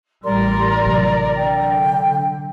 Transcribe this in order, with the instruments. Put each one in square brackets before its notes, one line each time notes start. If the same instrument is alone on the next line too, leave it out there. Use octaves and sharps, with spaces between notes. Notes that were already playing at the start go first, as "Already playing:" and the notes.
[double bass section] A1 G3 [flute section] A#4 D5 [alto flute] C6
[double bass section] A1 [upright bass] C3 F#3
[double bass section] D3 [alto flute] G5